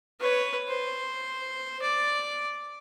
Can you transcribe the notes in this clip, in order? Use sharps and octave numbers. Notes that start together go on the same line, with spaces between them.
B4 C#5
C5
D5